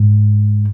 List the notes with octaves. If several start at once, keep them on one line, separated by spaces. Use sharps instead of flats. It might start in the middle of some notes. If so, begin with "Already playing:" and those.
Already playing: G#2